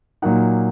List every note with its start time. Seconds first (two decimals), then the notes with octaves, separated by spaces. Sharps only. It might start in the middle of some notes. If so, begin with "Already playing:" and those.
0.22 A#2 F#3 A#3 D#4 F#5